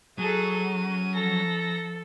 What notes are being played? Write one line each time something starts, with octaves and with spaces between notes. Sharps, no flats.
F#3 G#4 A4 D#7
C#4
F3 A4 A#5 A#6